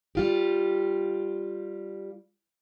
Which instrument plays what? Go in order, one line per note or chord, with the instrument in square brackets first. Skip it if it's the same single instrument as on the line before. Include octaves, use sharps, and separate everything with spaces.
[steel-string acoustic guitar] G3 F4 G4